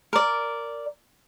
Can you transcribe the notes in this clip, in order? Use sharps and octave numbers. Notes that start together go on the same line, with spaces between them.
A#4 D5